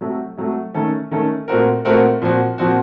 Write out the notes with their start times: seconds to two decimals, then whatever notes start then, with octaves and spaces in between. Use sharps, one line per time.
0.01 C3 F#3 A3
0.37 C3 F#3 A3
0.74 D#3 A3 C#4 A4
1.11 D#3 A3 C#4 A4
1.48 A#2 A3 C4 F#4 A#4
1.85 A#2 A3 C4 F#4 A#4
2.22 A#2 F3 C4 F#4
2.58 A#2 F3 C4 F#4